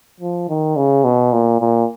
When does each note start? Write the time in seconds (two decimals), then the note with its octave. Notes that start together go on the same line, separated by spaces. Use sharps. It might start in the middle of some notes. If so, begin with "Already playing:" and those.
0.20 F3
0.49 D#3
0.76 C#3
1.04 B2
1.33 A#2
1.60 A#2